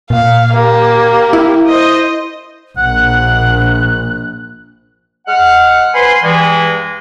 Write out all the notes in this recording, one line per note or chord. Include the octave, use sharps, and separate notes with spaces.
A#2 F5
A#3 G4
E4
C5 D#5
A#1 F#5 F#6
G#3 F#5 F6
B4 C5 G#5 B5 C6
G2 E3 G#3